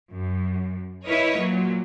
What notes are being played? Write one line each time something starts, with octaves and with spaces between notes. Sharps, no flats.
F#2
E4 A#4 B4 C#5 D#5
A#2 F#3